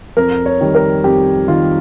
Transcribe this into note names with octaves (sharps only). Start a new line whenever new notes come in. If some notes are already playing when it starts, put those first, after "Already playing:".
F2 A#4
C#5
D#3 G3
A#4
F2 G4
D#3 G3 F4